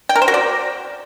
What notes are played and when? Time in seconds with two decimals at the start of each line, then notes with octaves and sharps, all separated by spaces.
0.09 G5
0.16 A#4
0.22 C5
0.28 F#4
0.34 D5